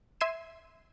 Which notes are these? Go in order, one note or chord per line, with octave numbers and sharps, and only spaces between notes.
E5 C6 G#6 C7 D#7 E7